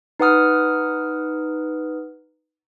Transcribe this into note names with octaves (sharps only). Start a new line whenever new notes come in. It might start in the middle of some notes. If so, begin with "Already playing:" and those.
D#4 B4 F#5 D#6 F6